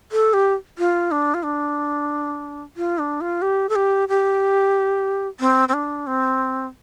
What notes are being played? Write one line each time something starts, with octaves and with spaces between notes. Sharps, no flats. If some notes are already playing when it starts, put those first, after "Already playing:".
A4
G4
F4
D4
F4
D4
F4
D4
F4
G4
A4
G4
G4
C4
C4
D4
C4